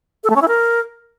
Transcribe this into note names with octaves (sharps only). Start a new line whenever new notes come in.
A4
A3
C#4
E4
A#4